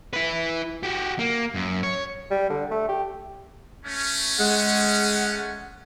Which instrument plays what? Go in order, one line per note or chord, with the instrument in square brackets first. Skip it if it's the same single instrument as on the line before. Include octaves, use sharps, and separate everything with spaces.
[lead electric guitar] E4 B4
F#4 G4
A#3
F#2
C#5
[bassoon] G3
D3
A3
G4
[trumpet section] A3 C#4
[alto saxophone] G#3 [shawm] F#5